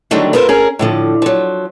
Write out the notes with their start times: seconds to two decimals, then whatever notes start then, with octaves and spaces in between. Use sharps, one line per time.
0.11 D3 D#3 F#3 G3 A3 D4
0.33 B3 F4 A4 A#4 C5
0.49 C#4 G#4 A#4
0.79 A2 D3 F3
1.22 F3 F#3